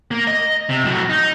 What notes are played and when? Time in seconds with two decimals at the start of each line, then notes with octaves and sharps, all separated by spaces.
0.11 A#3
0.27 D#5
0.69 C3
0.84 A2 F#3
1.10 D#4